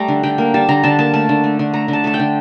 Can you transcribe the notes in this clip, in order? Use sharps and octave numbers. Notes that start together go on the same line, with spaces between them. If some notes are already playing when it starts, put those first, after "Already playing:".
Already playing: G3 A3 A#5
D3
D3 G5
A#3
G3 A5
D3 A#5
D3 A5
A#3 A5
A3 A5
D3
A3
D3
A3 A#5
D3
A5
A3 A5
G5
D3